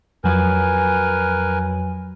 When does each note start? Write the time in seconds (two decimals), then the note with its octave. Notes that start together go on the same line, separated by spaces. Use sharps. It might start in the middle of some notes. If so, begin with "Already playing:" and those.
0.24 F2 F#3 A#4 B4 G#5